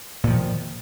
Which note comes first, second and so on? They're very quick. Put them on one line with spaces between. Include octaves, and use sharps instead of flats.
A#2 F3 D#3